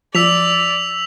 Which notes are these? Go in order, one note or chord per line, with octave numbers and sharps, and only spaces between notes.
F3 D5 E6 B6 F7